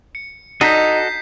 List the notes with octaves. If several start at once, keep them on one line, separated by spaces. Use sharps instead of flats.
C#7
D#4 F#4 A4 D#5 G6 B6 C7